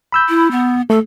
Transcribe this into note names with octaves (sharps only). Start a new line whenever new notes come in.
B5 E6 G6
E4
B3
A3 A4